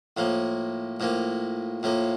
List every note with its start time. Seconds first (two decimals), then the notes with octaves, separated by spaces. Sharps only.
0.17 A2 F3 A#3
1.00 A2 F3 A#3
1.83 A2 F3 A#3